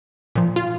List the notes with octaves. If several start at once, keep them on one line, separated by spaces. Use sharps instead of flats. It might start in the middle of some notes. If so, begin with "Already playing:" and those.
A#2 F3
F4